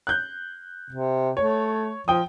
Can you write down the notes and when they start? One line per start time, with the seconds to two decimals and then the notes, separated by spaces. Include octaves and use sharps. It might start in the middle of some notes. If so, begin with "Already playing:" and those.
0.07 F#6 G6
0.90 C3
1.37 A3 C#5
2.08 F3 G5 D#6